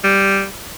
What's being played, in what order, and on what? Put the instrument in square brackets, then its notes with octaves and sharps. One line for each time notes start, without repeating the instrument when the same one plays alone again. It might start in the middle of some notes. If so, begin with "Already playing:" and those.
[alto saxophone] G3